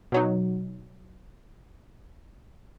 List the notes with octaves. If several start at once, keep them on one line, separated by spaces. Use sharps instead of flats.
B2 F#3 D#4